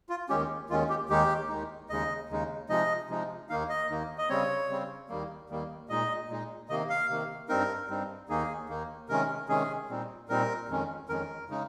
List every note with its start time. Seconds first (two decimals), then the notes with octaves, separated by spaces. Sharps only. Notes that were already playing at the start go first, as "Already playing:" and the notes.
0.09 F4
0.29 D#2 D#3 G#3 C#4 G4
0.69 D#2 D#3 G#3 C#4 F4
0.89 G4
1.09 D#2 D#3 G#3 D#4 G4
1.49 D#2 D#3 G#3 D#4
1.89 D#2 C#3 G#3 D#4 D#5
2.29 D#2 C#3 G#3 D#4
2.69 C3 F3 G#3 D#4 D#5
3.09 C3 F3 G#3 D#4
3.49 D#2 D#3 A#3 D#4 F5
3.69 D#5
3.89 D#2 D#3 A#3 D#4
4.18 D#5
4.29 C#3 G3 C4 C#5
4.69 C#3 G3 C4
5.09 D#2 D#3 G3 A#3
5.50 D#2 D#3 G3 A#3
5.89 A#2 G#3 D#4 D#5
6.29 A#2 G#3 D#4
6.69 C3 D#3 A#3 D#5
6.89 F5
7.09 C3 D#3 A#3
7.48 G2 G3 C4 D#4 A#4
7.89 G2 G3 C4 D#4
8.29 D#2 D#3 A#3 D#4 G#4
8.69 D#2 D#3 A#3 D#4
9.09 C3 D#3 G#3 C#4 A#4
9.49 C3 D#3 G#3 C#4 G#4
9.89 A#2 G3 C4 D#4
10.29 A#2 G3 C4 D#4 A#4
10.69 F2 D#3 G#3 C#4
11.09 F2 D#3 G#3 C#4 A#4
11.50 C#3 G#3 D#4